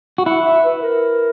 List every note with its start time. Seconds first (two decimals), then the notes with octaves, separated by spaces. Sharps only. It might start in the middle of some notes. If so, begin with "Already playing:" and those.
0.18 F#4
0.26 E4 F#5
0.45 E5
0.64 B4
0.83 A#4